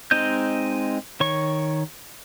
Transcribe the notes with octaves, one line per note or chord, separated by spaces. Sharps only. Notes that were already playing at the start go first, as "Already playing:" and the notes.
G#3 C4 D#4 D#5 G6
D#3 C#5 C#6